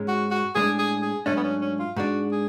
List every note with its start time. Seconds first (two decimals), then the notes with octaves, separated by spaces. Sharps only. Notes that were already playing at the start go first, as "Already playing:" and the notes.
Already playing: G#2 G#3 C#4
0.08 F#4
0.31 F#4
0.55 A2 G#3 D4 G#4
0.79 G#4
1.02 G#4
1.26 G#2 F#3 A3 C#4 D4
1.37 B3
1.44 C#4
1.62 C#4
1.79 F4
1.96 G#2 G#3 D4 F#4
2.32 G#4